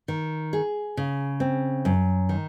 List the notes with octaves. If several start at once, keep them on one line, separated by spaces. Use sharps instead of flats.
D#3
G#4
C#3
C4
F#2
D#3